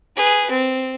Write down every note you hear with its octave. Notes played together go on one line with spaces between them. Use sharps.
G#4 B4
C4